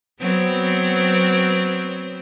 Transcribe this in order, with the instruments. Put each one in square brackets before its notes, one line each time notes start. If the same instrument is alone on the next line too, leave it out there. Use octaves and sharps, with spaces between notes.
[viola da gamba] F#3 B3 C4